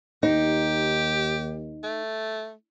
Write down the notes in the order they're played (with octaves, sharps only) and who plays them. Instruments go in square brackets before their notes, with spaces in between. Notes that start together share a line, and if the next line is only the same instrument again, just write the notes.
[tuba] D#2 [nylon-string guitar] D#4 [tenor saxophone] G4
[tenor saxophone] A3